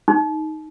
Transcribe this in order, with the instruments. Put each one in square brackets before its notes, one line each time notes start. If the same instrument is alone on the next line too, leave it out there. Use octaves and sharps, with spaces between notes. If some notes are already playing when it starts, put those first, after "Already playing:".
[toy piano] D#4